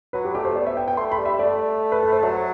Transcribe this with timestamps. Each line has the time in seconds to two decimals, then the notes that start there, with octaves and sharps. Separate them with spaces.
0.13 F#3 B4
0.25 G4
0.35 A3 G4
0.45 C5
0.56 B3 D5
0.67 E5
0.77 G5
0.88 G5
0.97 A3 C6
1.12 B5
1.18 G3
1.25 E5
1.39 A3 D5
1.92 B4
2.03 A4
2.12 C5
2.23 F#3 A5